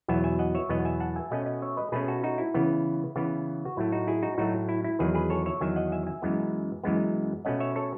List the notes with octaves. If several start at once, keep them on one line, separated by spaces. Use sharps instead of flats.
E2 B2 F#3 B3 E5 G#5
E5 G#5
D#5 F#5
C#5 E5
E2 B2 F#3 B3 D#5 F#5
E5 G#5
F#5 A5
E5 G#5
B2 A3 C#4 D#5 F#5
D#5 F#5
C#5 E5
B4 D#5
B2 A3 C#4 G#4 B4
F#4 A4
D#4 F#4
E4
C#3 E3 B3
C#3 E3 B3
F#4
A2 F#3 A3 E4
D#4 F#4
E4 G#4
D#4 F#4
A2 F#3 A3 D#4 F#4
E4
E4
E2 D#3 F#3 G#4 B4
G#4 B4
A4 C#5
C#5 E5
E2 D#3 F#3 E5 G#5
D#5 F#5
E5 G#5
E5 G#5
F#2 E3 G#3 B3
F#2 E3 G#3 B3
B2 A3 C#4 D#5 F#5
C#5 E5
A4 C#5